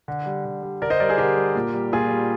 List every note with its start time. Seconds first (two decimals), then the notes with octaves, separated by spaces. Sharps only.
0.08 D3
0.26 G3
0.45 D3
0.63 G3
0.82 D3 A#4 D5
0.90 C5 D#5
1.00 G3 A#4 D5
1.09 G#4 C5
1.18 D3 G4 A#4
1.36 G3
1.55 A#2
1.74 G3
1.92 A#2 F4 G#4
2.11 G3